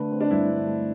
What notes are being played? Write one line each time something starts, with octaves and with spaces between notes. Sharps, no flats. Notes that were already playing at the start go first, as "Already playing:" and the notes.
Already playing: D3 A3 B4
C4
D4
G2 E4
D3
A3